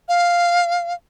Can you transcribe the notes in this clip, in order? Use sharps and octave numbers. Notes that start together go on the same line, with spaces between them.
F5